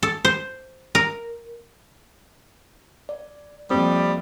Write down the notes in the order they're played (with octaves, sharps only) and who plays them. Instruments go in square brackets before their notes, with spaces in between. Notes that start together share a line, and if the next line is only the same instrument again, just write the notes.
[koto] A4
C5
A#4
[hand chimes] D5
[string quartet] F2 [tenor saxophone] G3 [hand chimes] A#3 D#6 [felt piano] C4